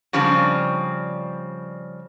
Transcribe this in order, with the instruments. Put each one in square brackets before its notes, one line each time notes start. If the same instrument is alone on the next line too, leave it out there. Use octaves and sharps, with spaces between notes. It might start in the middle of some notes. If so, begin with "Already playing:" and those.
[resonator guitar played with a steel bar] C#3 F3 G3 C4 D4